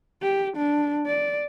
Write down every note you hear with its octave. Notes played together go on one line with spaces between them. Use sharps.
G4
D4
D5